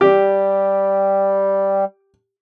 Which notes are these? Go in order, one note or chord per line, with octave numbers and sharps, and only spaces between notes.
G3 G4